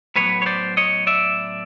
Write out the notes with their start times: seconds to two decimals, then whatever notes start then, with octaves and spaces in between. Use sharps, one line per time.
0.16 A2 F#3 B3 B4 C#5
0.42 C#5
0.46 C5 D5
0.77 C#5 D#5
1.07 D5 E5